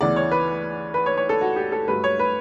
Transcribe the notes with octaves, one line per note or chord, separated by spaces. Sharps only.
D2 C#3 E3 B3 D5
C#5
B4
B4
C#5
C#5
A4
F#4
G4
A4
G2 F#3 A3 B4
C#5
B4